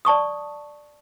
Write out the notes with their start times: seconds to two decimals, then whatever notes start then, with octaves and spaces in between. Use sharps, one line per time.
0.05 D5 A5 C#6 D#6